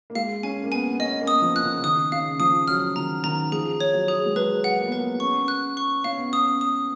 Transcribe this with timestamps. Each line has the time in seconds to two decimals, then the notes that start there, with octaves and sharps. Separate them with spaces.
0.10 A#3
0.15 G#3 F5
0.43 C#4 G#5
0.64 A#3
0.72 B3 G#5
0.93 B3
1.00 C#4 D#5
1.21 A#3
1.27 D#6
1.42 F3
1.56 F#6
1.63 C#3
1.83 D#3 D#6
2.12 C#3 F5
2.40 F3 D#6
2.68 F#3 F6
2.96 D#3 A#5
3.24 D#3 A#5
3.52 F3 G#4
3.80 C#5
3.94 F#3
4.08 G#4
4.26 G#3
4.36 F#3 B4
4.64 F#5
4.79 A#3
4.87 B3
4.92 A#3 B4
5.20 C#4 C#6
5.48 F#6
5.77 C#6
6.04 C#4 F5
6.18 B3
6.31 C#4 D#6
6.61 D#6